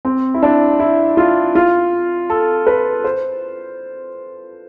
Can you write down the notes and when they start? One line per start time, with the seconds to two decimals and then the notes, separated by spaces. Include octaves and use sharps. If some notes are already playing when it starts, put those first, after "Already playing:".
0.05 C4
0.34 E4
0.43 D4
0.80 E4
1.17 F4
1.55 F4
2.30 A4
2.67 B4
3.04 C5